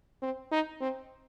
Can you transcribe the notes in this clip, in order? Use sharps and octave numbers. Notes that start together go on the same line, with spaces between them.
C4
D#4
C4